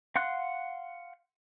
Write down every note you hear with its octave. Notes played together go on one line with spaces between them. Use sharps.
F5 F#5 C6 F#6